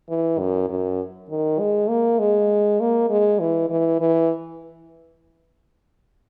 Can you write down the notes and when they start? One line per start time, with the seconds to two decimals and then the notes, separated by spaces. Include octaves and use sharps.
0.09 E3
0.39 F#2
0.69 F#2
1.30 D#3
1.59 G#3
1.89 A#3
2.19 G#3
2.80 A#3
3.10 G#3
3.40 E3
3.70 E3
4.00 E3